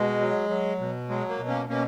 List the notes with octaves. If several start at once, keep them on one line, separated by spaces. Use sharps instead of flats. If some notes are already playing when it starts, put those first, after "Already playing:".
Already playing: B2 G#3
F#3
F#3
B2
F#3 G#3
A#3
B2
A#3 C#4
B2 A#3 C#4